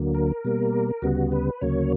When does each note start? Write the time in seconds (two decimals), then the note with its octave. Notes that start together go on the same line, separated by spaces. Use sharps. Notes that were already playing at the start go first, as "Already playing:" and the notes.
Already playing: D2 D3 F#3 A#3
0.14 A#4
0.44 B2 G3 A#3
1.02 D2 C#3 G3 B3 F#4
1.32 B4
1.61 D2 C#3 F#3 A#3 C#5